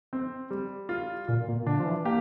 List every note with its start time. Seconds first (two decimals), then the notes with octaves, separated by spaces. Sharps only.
0.13 C4
0.51 G3
0.89 F4
1.28 A#2 F4
1.48 A#2
1.66 D3 D4
1.79 F3
1.85 E3
2.05 A#3 G4